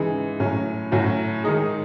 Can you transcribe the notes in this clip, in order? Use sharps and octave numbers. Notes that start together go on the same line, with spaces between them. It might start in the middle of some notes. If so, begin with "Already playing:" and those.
Already playing: C#3 E3 G#3 D#4 G#4
A2 F#3 C#4
A2 F#3 C#4 F#4
D#3 G#3 D#4 G#4